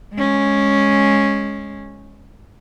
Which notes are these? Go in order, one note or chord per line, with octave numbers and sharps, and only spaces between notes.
G#3 C#4